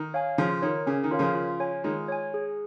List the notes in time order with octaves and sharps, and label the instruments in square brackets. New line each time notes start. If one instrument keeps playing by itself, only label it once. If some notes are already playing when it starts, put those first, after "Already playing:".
Already playing: [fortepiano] D#3
[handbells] C#5 F5 G#5
[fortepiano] C#3 F3 [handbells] F4
[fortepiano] D#3 [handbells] A#4 C#5
[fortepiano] C#3 [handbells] C#4
[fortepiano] D#3
[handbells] F4 A#4 C#5 F5
[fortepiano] C#3 F3
[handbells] F4
C#5 G#5
[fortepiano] D#3 G#3 [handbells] F4
[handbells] C#5 G#5
G#4